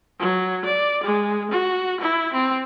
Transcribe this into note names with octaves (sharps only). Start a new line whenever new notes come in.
F#3
D5
G#3
F#4
E4
C4